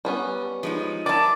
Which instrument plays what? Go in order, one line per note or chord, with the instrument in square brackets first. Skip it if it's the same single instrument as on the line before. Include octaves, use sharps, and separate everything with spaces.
[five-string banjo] G3 B3 C#4
[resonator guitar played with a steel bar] F3 G#3 D#4
[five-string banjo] D#3 E4 [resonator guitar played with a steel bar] D5 A5 [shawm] D6